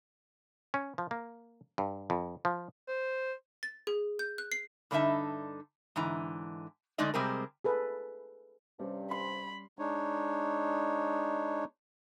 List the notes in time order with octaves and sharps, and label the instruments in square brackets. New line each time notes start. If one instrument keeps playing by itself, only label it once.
[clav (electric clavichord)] C#4
F3
A#3
G2
F2
F3
[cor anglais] C5
[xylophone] A6
G#4
G6
F#6
C7
[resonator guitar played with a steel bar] G2 D3 D4 D#4 E5 A5
G#2 D3 E3 A#5
D3 G#3 A3 D#4 D5 D#5
C3 G3 G#3 C4 G#4 A#4
[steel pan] G#4 A4 B4
[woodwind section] G2 C3 [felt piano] G3 C#4 D5
[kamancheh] B5 [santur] C6
[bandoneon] G#3 D4 D#4 C#5